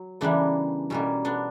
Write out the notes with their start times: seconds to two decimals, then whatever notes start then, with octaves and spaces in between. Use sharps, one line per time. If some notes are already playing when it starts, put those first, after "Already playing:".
Already playing: F#3
0.21 C#3 E3 G3 A#3 B3 D4
0.90 B2 G3 A#3 C#4
1.25 B3 D4